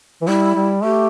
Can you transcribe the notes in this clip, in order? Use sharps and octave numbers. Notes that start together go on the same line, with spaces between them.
E3
G3 E4
G3
A3 G4